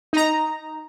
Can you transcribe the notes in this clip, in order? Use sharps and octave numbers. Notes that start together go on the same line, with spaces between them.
D#4 A#5